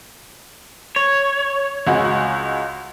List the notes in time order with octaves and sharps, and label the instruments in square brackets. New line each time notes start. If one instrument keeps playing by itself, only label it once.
[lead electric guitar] C#5
[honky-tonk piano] C#2 G#3 F#4